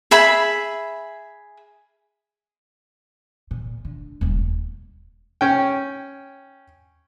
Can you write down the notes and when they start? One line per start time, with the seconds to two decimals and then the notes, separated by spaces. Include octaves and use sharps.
0.11 G#4 E5 B5
3.51 A#2
3.85 D3
4.21 D#1 C#2
5.41 C#4 G5